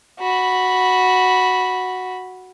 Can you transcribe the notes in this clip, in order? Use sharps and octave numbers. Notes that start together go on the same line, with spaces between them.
F#4 B5